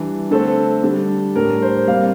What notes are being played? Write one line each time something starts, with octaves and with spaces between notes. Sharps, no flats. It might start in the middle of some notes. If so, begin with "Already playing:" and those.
Already playing: E3 G3 D4
D3 A3 C4 A4
D3 G3 D4
A2 G3 D4 A#4
C5
C3 G3 A#3 F5